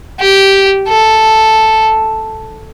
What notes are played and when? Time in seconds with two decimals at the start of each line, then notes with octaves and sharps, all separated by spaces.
0.20 G4
0.89 A4